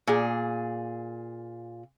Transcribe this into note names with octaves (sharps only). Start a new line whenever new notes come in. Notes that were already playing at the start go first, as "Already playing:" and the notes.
A#2 G#4